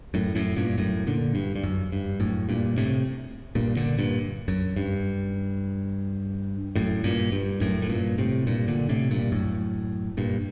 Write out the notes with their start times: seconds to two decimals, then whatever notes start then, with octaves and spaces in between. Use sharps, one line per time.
0.14 F#2 A2
0.35 F#2 A2
0.57 G2 A#2
0.78 F#2 A2
1.07 A#2 D3
1.35 G2
1.56 G2
1.64 F#2
1.92 G2
2.20 F#2 A2
2.49 G2 A#2
2.77 A2 C3
3.55 G2 A#2
3.77 A#2 D3
3.98 G2 A#2
4.48 F#2
4.76 G2
6.76 F#2 A2
7.04 G2 A#2
7.32 G2
7.61 F#2 A2
7.82 A2
7.89 G2 A#2
8.18 A2 C3
8.47 G2 A#2
8.68 A#2 D3
8.89 A2 C3
9.11 G2 A#2
9.32 F#2 A2
10.17 G2 A#2